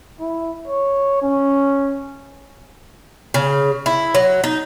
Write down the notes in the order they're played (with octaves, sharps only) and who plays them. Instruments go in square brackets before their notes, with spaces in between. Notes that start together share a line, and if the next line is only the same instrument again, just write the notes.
[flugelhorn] E4
C#5
C#4
[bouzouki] C#3
E4
F#3
D#4